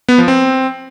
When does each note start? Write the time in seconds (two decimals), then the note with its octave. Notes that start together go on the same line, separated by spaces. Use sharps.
0.09 B3
0.18 F3
0.28 C4